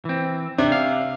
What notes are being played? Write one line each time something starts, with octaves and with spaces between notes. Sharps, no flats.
E3 C4
C3 D4
F5